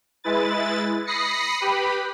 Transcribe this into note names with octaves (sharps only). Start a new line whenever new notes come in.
G#3 E4 B4 A6
B5 D#6 A#6 C7 C#7
G4 B4 B5